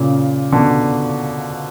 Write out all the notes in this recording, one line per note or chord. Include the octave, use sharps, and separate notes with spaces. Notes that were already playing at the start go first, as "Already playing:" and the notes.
Already playing: A#2 C#3
B2 D3